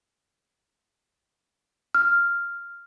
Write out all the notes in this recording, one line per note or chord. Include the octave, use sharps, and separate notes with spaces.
F6